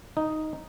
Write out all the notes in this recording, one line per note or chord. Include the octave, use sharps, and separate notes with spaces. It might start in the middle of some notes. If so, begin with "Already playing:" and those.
D#4